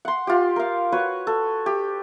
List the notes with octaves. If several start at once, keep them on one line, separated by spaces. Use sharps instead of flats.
F#5 C6
F4 G4
A#4 F5
F#4 B4 C#5
A4
G4